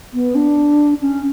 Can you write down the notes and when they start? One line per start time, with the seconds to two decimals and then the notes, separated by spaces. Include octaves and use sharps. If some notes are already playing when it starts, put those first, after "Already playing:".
0.14 B3
0.35 D4
1.01 C#4